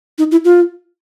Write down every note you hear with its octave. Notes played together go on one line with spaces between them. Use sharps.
D#4
E4
F4